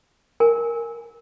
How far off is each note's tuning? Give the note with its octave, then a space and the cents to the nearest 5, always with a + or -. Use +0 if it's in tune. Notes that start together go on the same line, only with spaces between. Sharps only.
A#4 +0 G#5 +0